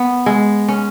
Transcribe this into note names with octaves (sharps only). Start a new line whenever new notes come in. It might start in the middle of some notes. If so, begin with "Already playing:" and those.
Already playing: B3
G#3
C#4